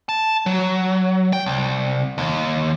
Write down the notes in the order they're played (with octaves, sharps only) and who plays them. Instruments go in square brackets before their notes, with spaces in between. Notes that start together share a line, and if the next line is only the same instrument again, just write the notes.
[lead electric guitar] A5
F#3
G5
C2
D#2